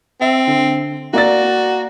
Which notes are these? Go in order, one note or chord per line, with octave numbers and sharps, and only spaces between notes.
C4 E5
D3
A#3 F#4 D5 A6